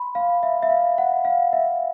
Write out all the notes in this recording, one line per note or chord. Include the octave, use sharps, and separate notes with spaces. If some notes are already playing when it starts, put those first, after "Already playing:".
Already playing: B5 C6
F5
E5
E5
F5
F#5
F5
E5